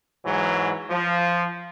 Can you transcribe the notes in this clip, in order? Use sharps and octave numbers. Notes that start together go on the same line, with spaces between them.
G#2 E3 F#3
F3